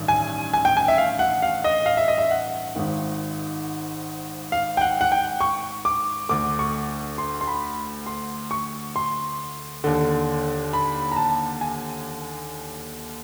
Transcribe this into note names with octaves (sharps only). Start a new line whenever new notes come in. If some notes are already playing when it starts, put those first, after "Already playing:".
Already playing: A1 G2 D#3
G#5
G#5
G5
G#5
E5
F5
F#5
F5
D#5
F5
E5
D#5
E5
F#5
G#1 G#2 D#3
F5
G5
F#5
F#5
G5
C#6
D6
D2 D3 D6
C#6
C6
C6
B5
C6
C#6
C6
D#2 D3
B5
A#5
A5
G#5